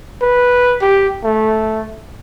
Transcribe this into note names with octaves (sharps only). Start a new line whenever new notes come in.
B4
G4
A3